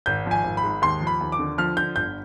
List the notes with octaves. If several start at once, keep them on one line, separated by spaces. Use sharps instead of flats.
G#1 G6
F3
G#5
G#1
B5
G#2
D#2 C6
F3
B5
D#2
D6
D3
F3 F6
D3 G6
G1 G6